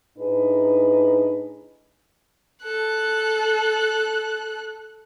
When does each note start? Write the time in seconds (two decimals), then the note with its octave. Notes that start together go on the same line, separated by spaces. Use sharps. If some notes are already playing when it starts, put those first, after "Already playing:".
0.18 A2 D4 D#4 G#4 B4
2.64 A4 F#6